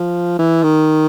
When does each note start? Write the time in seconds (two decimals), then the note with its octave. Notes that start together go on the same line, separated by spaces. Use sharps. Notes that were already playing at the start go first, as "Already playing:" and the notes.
Already playing: F3
0.39 E3
0.63 D#3